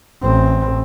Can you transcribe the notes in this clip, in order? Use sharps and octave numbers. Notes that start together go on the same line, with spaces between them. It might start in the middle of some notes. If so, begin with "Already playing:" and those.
A1 C4